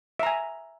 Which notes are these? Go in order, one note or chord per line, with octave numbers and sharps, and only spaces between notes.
E5 G#5 A#5